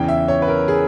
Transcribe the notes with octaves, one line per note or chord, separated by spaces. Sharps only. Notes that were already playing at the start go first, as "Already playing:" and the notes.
Already playing: E2 C#3 E3 G5
E5
C#5
B4
A#4
G#4